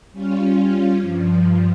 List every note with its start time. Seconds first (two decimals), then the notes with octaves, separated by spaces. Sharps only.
0.12 G3 C#4 F4
1.00 G2 F3